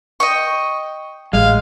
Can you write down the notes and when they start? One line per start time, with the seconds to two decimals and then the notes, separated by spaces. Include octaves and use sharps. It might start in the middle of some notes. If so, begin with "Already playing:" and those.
0.20 D#5 G5 C#6
1.33 A1 G#3 F5